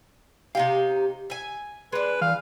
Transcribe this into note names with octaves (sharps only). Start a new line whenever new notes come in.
C3 D#4 G4 F5
E5 G#5
G#3 D4 B4
E3 F5